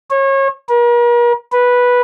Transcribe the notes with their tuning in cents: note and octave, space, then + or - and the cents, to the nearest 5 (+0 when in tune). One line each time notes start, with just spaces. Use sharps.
C#5 -30
A#4 +45
B4 -10